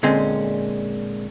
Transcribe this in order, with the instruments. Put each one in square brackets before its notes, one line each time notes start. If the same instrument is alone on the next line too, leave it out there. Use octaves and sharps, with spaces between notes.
[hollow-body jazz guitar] A#2 D3 G#3 C4 C#4